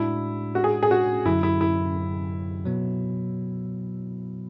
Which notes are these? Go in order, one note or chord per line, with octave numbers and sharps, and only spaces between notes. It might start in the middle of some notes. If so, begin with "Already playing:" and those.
Already playing: A2 G#3 D4 E4 F#4
F#4
G#4
G#4
F#4
F#2 D3 F#3 E4
E4
E4
B2 F#3 B3